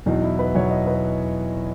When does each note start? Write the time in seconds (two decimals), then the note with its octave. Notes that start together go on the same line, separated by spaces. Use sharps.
0.06 E2 B2 F#3 D#4
0.22 E4
0.39 B4
0.55 E2 B2 F#3 C#5
0.70 D#5
0.87 B4